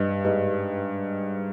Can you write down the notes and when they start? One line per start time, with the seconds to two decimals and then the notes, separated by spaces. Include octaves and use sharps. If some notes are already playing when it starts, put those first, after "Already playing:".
Already playing: G2 G4 B4 D#5
0.25 G#2 G4 B4 D#5